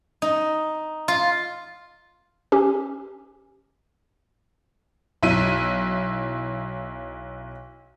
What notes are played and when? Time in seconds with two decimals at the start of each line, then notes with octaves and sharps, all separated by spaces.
0.22 D#4
1.08 F4
2.52 C#4 G4
5.23 B1 E4 D#7